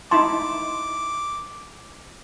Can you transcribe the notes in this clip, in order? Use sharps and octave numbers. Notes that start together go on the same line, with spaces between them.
D#4 E4 A5 C6 D6